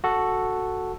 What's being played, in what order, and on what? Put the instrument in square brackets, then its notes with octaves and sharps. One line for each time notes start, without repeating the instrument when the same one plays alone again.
[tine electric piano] F#4 A4